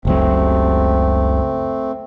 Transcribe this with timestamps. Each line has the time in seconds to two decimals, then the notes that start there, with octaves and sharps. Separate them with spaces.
0.05 F#1 C#2 F#3 A3 C4